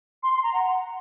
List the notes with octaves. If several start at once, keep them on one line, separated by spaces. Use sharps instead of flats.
C6
C6
A#5
F#5